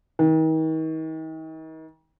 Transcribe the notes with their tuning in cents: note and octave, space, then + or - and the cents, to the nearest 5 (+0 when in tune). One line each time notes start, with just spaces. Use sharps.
D#3 +40